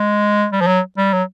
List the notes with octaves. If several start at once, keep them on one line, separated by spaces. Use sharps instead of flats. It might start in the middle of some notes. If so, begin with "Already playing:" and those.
Already playing: G#3
G3
F3
F#3
G3
F#3